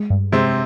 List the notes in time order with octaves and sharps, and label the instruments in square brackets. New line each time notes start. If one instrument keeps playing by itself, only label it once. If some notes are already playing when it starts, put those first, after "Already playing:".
Already playing: [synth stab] G#3
G2
[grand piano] C3 C4 [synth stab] G#3